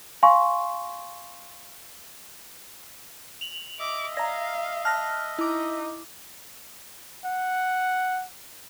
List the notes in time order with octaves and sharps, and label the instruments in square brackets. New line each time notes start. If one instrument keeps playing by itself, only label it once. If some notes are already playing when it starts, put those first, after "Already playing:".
[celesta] F5 G#5 C6 C#6
[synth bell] F7 F#7
[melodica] D#5 E5 [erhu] D6
[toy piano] D5 A#5 [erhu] F5 [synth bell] A#6
[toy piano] A5 [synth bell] F6 F#6 A#6
[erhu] D#4 [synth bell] E4 D6
[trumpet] F#5